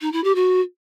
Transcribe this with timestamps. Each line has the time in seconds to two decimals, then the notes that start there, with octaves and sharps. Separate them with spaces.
0.01 D#4
0.12 E4
0.24 G4
0.35 F#4